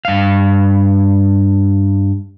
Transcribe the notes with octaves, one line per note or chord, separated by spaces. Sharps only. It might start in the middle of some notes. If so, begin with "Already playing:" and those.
G2 F5